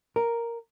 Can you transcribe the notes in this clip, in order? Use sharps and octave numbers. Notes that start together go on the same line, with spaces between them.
A#4